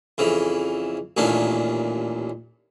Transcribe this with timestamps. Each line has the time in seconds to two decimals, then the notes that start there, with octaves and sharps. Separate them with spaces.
0.18 F2 C#3 E3
1.17 A1 D#2 A#2 C#4 D4